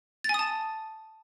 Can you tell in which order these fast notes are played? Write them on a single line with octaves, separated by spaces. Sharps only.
A6 G#5 D#6 A5